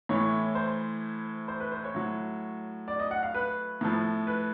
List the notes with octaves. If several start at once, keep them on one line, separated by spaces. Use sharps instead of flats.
A2 E3 C#5
C5
C5
B4
C5
C#5
A2 F#3
D5
D#5
F#5
F5
B4
A2 F3
B4